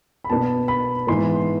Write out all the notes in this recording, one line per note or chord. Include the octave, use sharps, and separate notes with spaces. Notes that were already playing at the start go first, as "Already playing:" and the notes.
B5
B2 B3 D4 A5
B5
G#2 E3 B3 C6